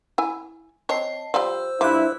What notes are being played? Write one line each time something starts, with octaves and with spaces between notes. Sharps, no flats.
E4 G#5
C4 C#5 D#5 A5 C7
F3 G3 C5 D5 E6
G2 F3 E4 D6 F#6